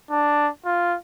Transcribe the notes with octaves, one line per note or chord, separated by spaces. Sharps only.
D4
F4